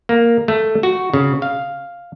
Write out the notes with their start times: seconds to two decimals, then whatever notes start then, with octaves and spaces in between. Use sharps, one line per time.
0.09 A#3
0.48 A3
0.83 F#4
1.13 C#3
1.42 F5